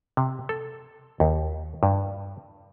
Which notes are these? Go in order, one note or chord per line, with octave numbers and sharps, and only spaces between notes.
C3
A4
D#2
G2